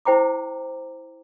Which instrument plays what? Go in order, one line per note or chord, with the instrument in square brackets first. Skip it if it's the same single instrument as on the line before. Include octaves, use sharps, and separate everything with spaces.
[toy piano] E4 C5 G5 A#5 D6